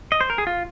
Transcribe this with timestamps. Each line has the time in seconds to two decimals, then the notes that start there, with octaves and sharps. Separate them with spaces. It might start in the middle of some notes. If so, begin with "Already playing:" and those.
0.12 D#5
0.21 C5
0.30 A#4
0.38 G#4
0.47 F4